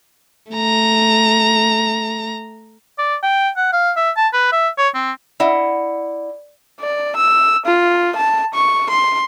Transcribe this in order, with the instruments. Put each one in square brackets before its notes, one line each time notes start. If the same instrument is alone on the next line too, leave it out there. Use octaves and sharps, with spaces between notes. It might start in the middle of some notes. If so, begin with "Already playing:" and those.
[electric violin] A3 A#5
[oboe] D5
G5
F#5
F5
E5
A5
B4
E5
C#5
C4
[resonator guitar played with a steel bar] E4 D#5 F#5 [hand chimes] D5
[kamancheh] D5
E6
F4
A5
C#6
C6